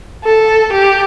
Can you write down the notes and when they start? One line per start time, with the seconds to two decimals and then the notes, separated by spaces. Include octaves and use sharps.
0.24 A4
0.73 G4